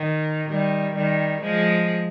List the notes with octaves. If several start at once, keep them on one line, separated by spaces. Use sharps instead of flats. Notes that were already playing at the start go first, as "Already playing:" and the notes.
Already playing: D#3
D#3 G3
D#3 G3
F3 G#3